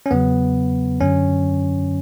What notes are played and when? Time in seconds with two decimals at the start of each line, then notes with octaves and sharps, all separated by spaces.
0.06 C#4
0.11 E2 C#3 F#3 B3
1.00 F#2 D3 F#3 C#4